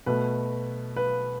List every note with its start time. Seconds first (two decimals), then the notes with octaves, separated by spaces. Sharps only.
0.06 B2 A3 B4
0.96 B4